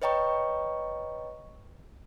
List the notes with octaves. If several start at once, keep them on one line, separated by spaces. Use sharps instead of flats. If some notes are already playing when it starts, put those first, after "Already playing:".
B4 C#5 D#5 G5 A#5 C#6